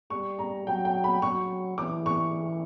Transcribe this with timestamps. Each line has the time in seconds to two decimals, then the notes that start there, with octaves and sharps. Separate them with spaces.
0.10 G3 C#6
0.39 A#5
0.66 F#3 G5
0.85 G5
1.04 B5
1.22 F#3 C#6
1.77 E3 D6
2.06 C#6